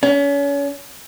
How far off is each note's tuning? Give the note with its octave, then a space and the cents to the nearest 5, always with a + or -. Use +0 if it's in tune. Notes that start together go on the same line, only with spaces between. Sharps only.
C#4 +35